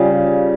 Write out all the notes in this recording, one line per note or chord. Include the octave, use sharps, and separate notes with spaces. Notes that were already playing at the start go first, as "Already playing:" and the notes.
Already playing: C#3 G3 C#4 F4